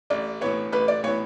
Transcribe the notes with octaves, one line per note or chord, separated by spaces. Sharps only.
A1 D5
A2 E3 B3 C#5
A1 B4
D5
A2 E3 B3 C#5